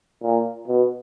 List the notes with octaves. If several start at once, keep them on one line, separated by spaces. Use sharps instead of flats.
A#2
B2